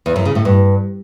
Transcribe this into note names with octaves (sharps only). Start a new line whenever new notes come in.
E2
F#2
C#3
A2
G2